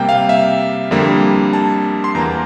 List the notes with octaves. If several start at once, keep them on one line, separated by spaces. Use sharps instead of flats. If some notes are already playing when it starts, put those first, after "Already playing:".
Already playing: C3 G3 A#3 G5
F5
E5
F2 D3 G3 A#3
A5
C6
E2 E3 A#3 A#5